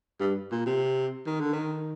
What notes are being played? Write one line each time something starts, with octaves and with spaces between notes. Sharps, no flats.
G2
A#2
C3
D#3
D3
D#3